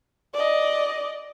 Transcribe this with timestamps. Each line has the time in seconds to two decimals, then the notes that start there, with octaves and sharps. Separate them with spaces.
0.34 D5 D#5